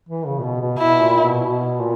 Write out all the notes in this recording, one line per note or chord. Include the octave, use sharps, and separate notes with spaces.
E3
C#3
A#2
B2
B2
B2 E4
A#2
B2
B2
A#2